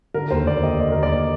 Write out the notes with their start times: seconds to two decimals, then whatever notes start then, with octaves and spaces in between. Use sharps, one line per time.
0.14 D3 A#4
0.31 D#2 C5
0.47 D#2 D5
0.63 D#2 D#5
0.81 D3 D5
0.92 D#2 A#4
1.03 D5